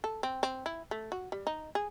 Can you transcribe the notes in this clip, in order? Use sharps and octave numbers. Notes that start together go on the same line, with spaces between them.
A4
C4
C4
E4
A3
F#4
G3
D#4
G#4